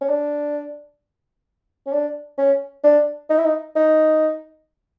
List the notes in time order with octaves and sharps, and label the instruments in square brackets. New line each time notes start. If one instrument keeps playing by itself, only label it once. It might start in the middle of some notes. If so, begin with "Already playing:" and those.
[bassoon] C#4
D4
C#4
D4
C#4
D4
D#4
E4
D#4
D#4